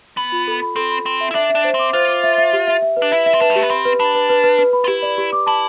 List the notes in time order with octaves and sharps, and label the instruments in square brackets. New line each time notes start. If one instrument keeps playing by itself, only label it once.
[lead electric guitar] B3 [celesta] B5
[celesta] F4
A4
B5
[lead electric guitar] C4 [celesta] A4
[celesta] B5
[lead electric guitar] C4 [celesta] A4
[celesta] E5
[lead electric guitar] E4
[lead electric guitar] D4 [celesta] E5
[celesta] E5
[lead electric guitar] D4
[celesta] C5
[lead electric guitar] C4
[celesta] D6
[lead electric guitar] F4 [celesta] C5
[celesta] D6
E5
E5
G4
E5
E5
B4
[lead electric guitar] D4
[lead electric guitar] E4 [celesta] E5
[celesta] E5
[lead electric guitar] C4
[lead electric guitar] D4 [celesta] B4
[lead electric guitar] G3
[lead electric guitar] A3 [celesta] G4
[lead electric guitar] B3
[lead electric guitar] C4 [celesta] B5
[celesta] B4
[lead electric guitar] D4 [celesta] B5
[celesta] B4
B4
B4
B4
B5
[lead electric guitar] F4
[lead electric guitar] E4 [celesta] G4
[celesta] D5
G4
D6
[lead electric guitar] E4 [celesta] A5